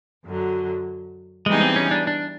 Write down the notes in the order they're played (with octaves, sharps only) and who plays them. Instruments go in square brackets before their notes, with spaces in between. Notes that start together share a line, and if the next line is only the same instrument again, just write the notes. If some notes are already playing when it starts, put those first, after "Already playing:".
[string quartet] F#2 D3 F#3
[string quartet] E3 G3 B3 D#4 G#4 [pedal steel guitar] G#3
[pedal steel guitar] C4
C#4
D4
D4